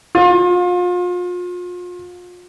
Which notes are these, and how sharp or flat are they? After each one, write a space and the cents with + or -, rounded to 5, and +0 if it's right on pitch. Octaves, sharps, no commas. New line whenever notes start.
F4 +35